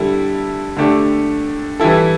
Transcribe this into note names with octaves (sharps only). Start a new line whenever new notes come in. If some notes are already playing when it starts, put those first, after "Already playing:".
Already playing: D3 G3 E4 A4
D3 A3 D4 G4
E3 G3 E4 A4